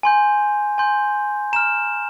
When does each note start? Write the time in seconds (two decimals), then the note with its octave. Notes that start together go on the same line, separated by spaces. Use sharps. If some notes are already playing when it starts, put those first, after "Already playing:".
0.03 G#5 C6 G6
0.78 G#5 C6 G6
1.53 A#5 F6 E7